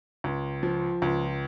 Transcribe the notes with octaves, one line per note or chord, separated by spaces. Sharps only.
C#2
F3
C#2